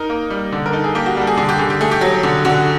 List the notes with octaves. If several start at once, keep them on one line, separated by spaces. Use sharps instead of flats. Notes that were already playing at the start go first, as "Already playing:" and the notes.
Already playing: D#4 A#4
A#3
G3
D3
A#4
D#4 A4
G#4
A#3 G4
F#4
G3 A4
G#4
D3 G#4
G4
D3 G#4
G4
A3 G#4
G4
F#3
D3
D3 F#4